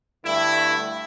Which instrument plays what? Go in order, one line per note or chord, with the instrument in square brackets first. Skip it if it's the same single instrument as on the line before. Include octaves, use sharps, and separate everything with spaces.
[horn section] G2 D3 A3 E4